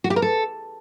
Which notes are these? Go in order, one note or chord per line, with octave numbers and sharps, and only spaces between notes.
F#4
G4
A#4
A4